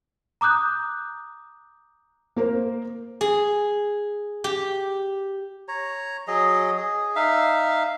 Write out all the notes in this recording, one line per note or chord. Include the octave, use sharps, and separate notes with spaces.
A#5 D6 D#6 F#6 G6
A#3 A#4 C5
G#4
G4
C#5 A#5
F#3 G#4 D#5
G#4
D#4 E5 F5